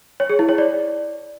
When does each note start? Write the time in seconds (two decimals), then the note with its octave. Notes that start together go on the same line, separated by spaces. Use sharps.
0.20 C#5
0.29 G#4
0.39 E4
0.49 C#5
0.58 D5